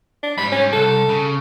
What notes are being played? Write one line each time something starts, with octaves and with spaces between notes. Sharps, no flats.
D4
G#2 G3 B5
C#4
C2 A4
C#3